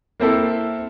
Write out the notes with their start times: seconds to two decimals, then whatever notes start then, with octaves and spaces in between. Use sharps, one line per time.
0.20 A#3 C4 E4 A4